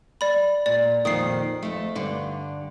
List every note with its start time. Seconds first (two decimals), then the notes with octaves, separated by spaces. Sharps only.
0.21 D5 B5
0.66 A#2 D5
1.05 F2 A#2 D#3 D#6 C7
1.63 F2 A3
1.95 G2 D3